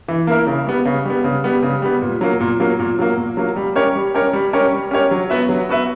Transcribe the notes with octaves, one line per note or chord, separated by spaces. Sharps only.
E3
A#3 E4 A#4
C#3
G3 B3
C#3
G3 B3
C#3
G3 B3
C#3
G3 B3
A#2
F#3 A#3
A#2
F#3 A#3
A#2
F#3 A#3
A#2
F#3 A#3
G3
C#4 G4 A#4 C#5
G3
C#4 G4 A#4 C#5
G3
C#4 G4 A#4 C#5
G3
C#4 G4 A#4 C#5
F#3
B3 F#4 B4 E5
F#3
B3 F#4 B4 E5